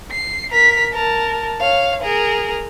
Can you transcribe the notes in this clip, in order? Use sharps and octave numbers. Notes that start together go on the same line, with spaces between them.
C7
A#4 B6
A#4 A5
C#5 F5
G#4 A#4